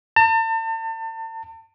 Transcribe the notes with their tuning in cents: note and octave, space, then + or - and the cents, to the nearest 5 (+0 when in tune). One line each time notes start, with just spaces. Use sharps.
A5 +40